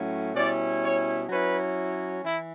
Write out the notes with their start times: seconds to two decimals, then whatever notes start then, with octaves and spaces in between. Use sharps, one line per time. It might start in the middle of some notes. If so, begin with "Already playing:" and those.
Already playing: A2 F#3 A3 C#4
0.35 B2 G3 C#4 E4 D5
0.82 C#5
1.28 F#3 C#4 E4 B4
2.23 E3 E4